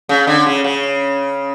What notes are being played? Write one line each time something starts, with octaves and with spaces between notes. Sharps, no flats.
C#3
D3
C#3
C#3